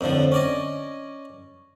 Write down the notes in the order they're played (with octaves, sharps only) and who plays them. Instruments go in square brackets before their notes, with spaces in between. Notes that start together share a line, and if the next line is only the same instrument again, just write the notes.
[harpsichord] F2 A2 D3 F3
C#4 D5 D#5